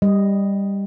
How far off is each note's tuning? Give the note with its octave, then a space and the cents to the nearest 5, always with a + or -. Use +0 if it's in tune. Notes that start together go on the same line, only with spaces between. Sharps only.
G3 +15 D#5 +0